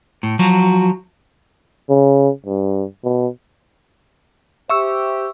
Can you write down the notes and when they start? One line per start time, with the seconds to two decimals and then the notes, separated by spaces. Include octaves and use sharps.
0.23 A2
0.39 F3 F#3 F#4
1.89 C#3
2.46 G2
3.04 B2
4.70 G4 C5 E5 C#6 E6